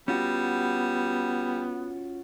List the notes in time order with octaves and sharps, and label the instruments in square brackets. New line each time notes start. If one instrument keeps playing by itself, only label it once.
[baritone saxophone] G3 [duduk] B3 [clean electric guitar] C#4 F4 F#4